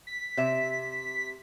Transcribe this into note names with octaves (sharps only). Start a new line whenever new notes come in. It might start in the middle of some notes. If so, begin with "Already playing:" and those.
B6
C3 E5